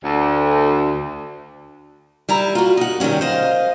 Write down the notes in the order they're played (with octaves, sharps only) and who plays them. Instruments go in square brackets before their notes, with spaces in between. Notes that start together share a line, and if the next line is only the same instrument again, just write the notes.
[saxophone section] D2
[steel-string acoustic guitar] G3 E4 A#5
F4 F#4
D#4 F#5
C3 D#3 G3 A#3 C#4
C5 D#5 F5